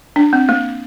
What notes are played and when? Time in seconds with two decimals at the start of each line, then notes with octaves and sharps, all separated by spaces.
0.16 D4
0.33 C4
0.49 A#3